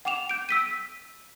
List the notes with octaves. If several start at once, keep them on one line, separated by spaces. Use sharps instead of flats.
F#5 G5 D6 E7 F7
G6 D7
E6 B6 D#7